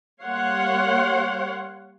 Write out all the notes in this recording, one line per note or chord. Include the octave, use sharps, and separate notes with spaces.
G3 A#3 C#5 F5 F#5 C6